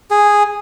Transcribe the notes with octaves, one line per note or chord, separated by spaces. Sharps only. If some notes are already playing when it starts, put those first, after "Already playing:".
G#4